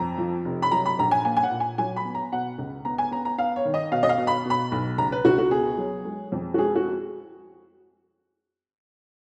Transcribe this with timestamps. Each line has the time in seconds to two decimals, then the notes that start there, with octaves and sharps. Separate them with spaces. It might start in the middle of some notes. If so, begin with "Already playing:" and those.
Already playing: F2 A#5
0.18 F3
0.45 F1
0.62 B5
0.71 F#3 A#5
0.86 B5
0.99 A#1 A#5
1.11 G#5
1.25 A#3 G#5
1.37 G#5
1.43 F#5
1.51 A#2
1.60 G#5
1.78 F#3 G#5
1.96 B5
2.05 B3
2.15 A#5
2.32 B2 F#5
2.58 C#2
2.85 B3 A#5
2.98 G#5
3.11 B3 A#5
3.25 A#5
3.38 B3 F5
3.56 C#5
3.65 D#3
3.74 D#5
3.92 B2 F5
4.03 D#5
4.09 F5
4.18 B2
4.27 B5
4.45 B2 B5
4.72 B1
4.98 C#2 A#5
5.12 B4
5.25 C#2 F#4
5.38 F#4
5.51 B3 G#4
5.78 F#3
6.05 G#3
6.32 F2
6.54 F#4
6.58 G#3 G#4
6.75 F#4